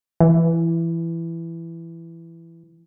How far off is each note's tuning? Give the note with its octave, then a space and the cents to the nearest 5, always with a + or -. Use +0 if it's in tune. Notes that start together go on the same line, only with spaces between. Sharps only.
E3 +15